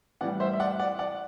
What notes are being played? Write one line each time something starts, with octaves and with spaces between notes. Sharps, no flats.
A2 E3 G3 D5 F#5
C5 E5
E5
D5 F#5
D5 F#5
D5 F#5